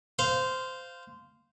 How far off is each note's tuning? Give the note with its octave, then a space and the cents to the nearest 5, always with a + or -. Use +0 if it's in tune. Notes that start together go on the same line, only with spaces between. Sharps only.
C5 -15 F5 +0